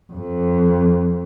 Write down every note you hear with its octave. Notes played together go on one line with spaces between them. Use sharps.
F2